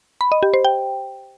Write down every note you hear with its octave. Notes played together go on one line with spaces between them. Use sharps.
B5
D#5
G4
C5
G5